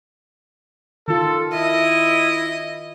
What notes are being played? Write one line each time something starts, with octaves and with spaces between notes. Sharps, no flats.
D#3 F4 A4
E4 D#5